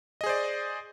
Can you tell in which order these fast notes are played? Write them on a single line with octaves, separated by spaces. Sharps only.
D#5 G#4 C5 D5